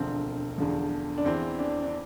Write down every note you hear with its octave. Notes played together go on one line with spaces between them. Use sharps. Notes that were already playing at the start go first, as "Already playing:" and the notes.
Already playing: E1 D2 D3 F3 C4
E2 D3 F3
D4
E2 E3 C4
D4
D4